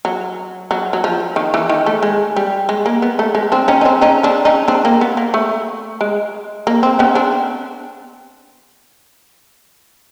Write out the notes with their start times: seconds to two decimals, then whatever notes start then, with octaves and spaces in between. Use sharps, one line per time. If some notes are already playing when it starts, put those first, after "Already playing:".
0.05 F#3
0.71 F#3
0.93 F#3
1.04 F3
1.36 D#3
1.54 E3
1.69 D#3
1.86 A3
2.03 G#3
2.36 G3
2.69 G#3
2.86 A#3
3.02 B3
3.19 A3
3.35 G#3
3.52 C4 D4
3.68 C#4 D#4
3.81 D#4
3.85 C4 D4
4.01 C#4 D#4
4.23 C4 D4
4.45 C#4 D#4
4.68 C4 D4
4.85 A#3
5.01 B3
5.17 A#3
5.34 A3
6.01 G#3
6.67 A#3
6.83 C4
6.99 B3 C#4
7.15 C4 D4